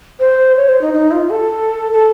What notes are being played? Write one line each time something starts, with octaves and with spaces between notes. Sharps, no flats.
C5
C#5
C5
D#4
D#4
F4
A4
A4